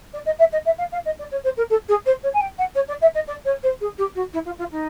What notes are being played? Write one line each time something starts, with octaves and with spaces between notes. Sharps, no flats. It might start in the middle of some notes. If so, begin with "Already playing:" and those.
D5
D#5
E5
D#5
E5
F5
F5
D#5
D5
C#5
C5
A#4
A4
G#4
C5
C#5
G#5
G5
F#5
C#5
D5
E5
D#5
D5
C#5
C5
G#4
G4
F#4
E4
F4
F4
D#4